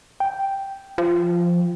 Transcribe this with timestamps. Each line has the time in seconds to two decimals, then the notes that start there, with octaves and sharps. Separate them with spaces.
0.20 G5
0.98 F3